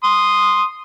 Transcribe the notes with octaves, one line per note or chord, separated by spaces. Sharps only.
C6 D#6